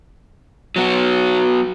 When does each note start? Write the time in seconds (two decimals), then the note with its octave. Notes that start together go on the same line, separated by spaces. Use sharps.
0.76 F#3 B3 F#4